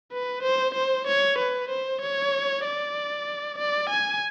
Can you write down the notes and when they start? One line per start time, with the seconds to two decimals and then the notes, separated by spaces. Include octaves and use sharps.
0.12 B4
0.43 C5
0.75 C5
1.07 C#5
1.39 B4
1.70 C5
2.01 C#5
2.65 D5
3.59 D5
3.90 G#5